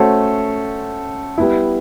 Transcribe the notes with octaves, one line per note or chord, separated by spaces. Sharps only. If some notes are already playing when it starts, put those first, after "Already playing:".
Already playing: A3 C#4 F#4 A4 C5
G3 B3 E4